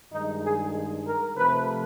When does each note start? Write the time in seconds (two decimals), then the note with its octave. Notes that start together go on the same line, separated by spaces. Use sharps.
0.12 G2 D#3 G#3 D#4
0.43 G#4
1.06 A#4
1.36 C3 F3 A3 B4